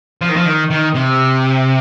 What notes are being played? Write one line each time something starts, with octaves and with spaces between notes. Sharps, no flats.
F3
D#3
F3
D#3
D#3
C3